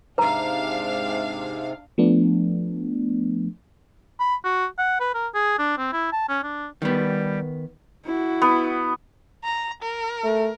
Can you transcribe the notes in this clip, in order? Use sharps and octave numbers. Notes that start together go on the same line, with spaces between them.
G#2 C3 D4 B4 F5 A#5
F3 A3 B3 D4
B5
F#4
F#5
B4
A#4
G#4
D4
C4
E4
A5
C#4
D4
D#3 G3 B3
E4 F#4
B3
A#5
A#4
A3